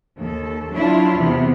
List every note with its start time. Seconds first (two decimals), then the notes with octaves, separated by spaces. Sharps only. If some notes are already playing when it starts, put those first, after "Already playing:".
0.18 D#2 A4
0.72 F#3 D4 E4 F4
1.15 E2 C3 B3